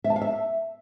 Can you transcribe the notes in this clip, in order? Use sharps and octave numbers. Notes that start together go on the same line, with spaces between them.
E5
A5
F5
E5